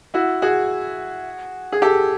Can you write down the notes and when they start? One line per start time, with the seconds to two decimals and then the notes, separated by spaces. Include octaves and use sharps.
0.14 E4 F#4
0.42 F#4 G#4
1.72 G#4
1.82 G4 A4